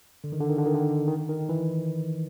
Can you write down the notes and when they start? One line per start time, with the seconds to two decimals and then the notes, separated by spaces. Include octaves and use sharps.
0.24 D3
0.32 D#3
0.40 D3
0.49 D#3
0.58 D3
0.66 D#3
0.74 D3
1.08 D#3
1.29 D#3
1.49 E3